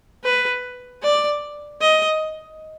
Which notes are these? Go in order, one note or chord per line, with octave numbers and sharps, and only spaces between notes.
B4
D5
D#5